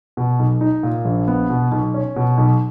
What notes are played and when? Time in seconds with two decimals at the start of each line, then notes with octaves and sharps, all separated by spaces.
0.17 B2
0.39 B1
0.61 D#4
0.83 A#2
1.05 A#1
1.28 B3
1.50 B2
1.72 B1
1.94 C#4
2.16 B2
2.38 B1